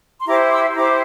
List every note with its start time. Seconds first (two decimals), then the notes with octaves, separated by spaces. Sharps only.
0.20 C6
0.28 E4 G4 C5 A#5 D6
0.52 C6 E6
0.70 C6
0.75 E4 G4 C5 A#5 D6